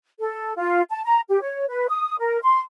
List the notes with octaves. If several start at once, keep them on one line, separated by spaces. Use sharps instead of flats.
A4
F4
A5
A#5
G4
C#5
B4
D#6
A#4
C6